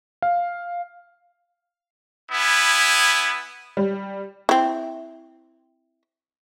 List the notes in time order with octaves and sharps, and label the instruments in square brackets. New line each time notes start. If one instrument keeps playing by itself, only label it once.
[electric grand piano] F5
[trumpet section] B3 E4 G#5
[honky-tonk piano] G3
[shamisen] C4 E4